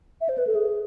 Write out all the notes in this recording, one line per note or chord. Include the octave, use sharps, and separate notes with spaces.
E5
C5
B4
A4
G#4